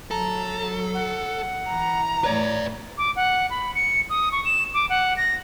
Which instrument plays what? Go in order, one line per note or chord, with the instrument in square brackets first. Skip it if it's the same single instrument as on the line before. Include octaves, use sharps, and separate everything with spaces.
[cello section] F#3 [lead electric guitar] A4 [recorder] A#5
[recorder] F#5
[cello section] E3 [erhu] A#5
[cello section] A2 E3 [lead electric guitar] B4 D5 [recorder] C#5
[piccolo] D6
F#5
B5
C#7
D#6
C#6
E7
D6
F#5
A#6